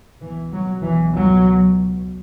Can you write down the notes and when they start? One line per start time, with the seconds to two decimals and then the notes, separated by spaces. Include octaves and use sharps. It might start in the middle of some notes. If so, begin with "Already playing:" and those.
0.21 C#2 B2 E3
0.52 F#3
0.83 E3
1.13 F#3